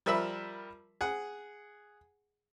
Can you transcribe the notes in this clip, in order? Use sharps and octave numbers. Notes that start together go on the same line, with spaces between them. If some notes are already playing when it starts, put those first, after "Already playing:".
F3 G3 A#4 E5 B5 E6
G#4 F#5